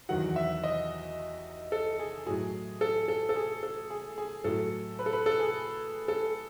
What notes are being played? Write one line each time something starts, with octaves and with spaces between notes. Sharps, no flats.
E2 D#3 F#3 F#5
E5
D#5
A4
G#4
A2 F#3 G#4
A4
A4
A4
G#4
A4
G#4
G#4
A2 F#3 A4
B4
A4
B4
A4
G#4
A4